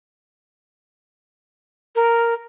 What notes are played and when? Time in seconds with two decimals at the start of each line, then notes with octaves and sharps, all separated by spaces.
1.96 A#4